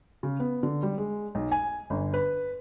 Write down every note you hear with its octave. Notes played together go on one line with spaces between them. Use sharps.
C#3
B3
D3
G3
G#3
B1
G#5
G1
B4